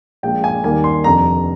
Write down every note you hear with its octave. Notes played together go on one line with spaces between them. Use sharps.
A#1 A#2 G#3 G5
G#5
D#2 D#3 G3 A#3 G#5
C6
F1 F2 D3 A#5